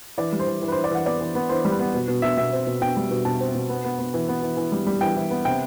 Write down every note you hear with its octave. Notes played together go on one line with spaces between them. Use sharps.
E3 D5
G3
C5
E3
E3
B4
C5
E3
D5
E3 F#5
B3 D5
E3
B3
E3 C5
G3
B4
B3
B2
B2
B2 E5
B2 E5
C4
B2
B2 G5
G3
B2
B2 A5
C4
B2
B3
B3
B3
E3
B3
E3
E3
G3
G3
E3 G5
E3
B3
C3 G5